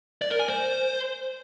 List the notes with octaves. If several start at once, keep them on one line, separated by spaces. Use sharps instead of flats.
D5
A#4
G#5
C5